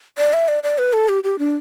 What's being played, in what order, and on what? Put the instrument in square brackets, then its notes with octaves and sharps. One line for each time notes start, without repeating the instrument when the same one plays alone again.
[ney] D5
E5
D5
D5
B4
A4
G4
G4
D4